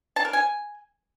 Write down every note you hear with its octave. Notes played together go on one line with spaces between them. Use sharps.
A5
A#4
G#5